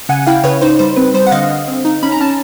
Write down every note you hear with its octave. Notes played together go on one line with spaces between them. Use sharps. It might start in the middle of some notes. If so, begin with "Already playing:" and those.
C#3 F#5 G#5
E4 F5 G5
C#3 B4 C#5
D#4 C5
G3 C5
C4 B4
G3 C5
F#5
D3 D#5 F5
D3
C4
D#4
C#4 B5
A#5
C#4 A5